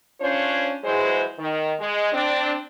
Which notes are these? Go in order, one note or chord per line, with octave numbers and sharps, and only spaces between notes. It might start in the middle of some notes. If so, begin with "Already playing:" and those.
C#4 D4 F4 C5 C#5
E3 F#3 G#3 G#4 C5
D#3
G#3
C4 D4